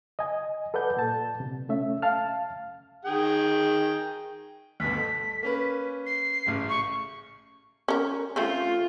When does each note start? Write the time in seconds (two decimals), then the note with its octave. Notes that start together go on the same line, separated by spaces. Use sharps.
0.19 D#5 G#5
0.74 A4 B4 D5 F#5 G6
0.97 A#2 A5
1.40 C3
1.69 A3 C#4 E5
2.02 F5 A5 F6
3.05 D#3 G#4 G5
4.80 D2 G2 B2 B6
4.95 A3
5.43 A#3 C#4 B4
6.06 C7
6.46 A1 C#3
6.69 C#6
7.88 C#4 A#4
8.36 A3 C4 C#4 F4